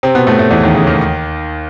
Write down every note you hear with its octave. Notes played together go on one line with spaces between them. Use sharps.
C3 C4
B2 B3
A2 A3
A2 A3
E2 E3
D#2 D#3
C#3
D#2 D#3